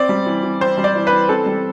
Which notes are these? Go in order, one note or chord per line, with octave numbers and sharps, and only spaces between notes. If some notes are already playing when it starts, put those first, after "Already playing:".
Already playing: C4 D5
G3
E3
E3
C4 C5
G3
D5
E3
B4
E3
C4 A4
G3